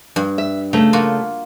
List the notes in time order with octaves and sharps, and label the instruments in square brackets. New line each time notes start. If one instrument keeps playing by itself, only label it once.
[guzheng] G2
[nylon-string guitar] E5
[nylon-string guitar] C#3 A3 [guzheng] A#5
[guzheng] A#3 F4 F#4